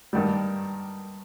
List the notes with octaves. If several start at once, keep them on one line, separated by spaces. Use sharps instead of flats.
G2 D#3 G3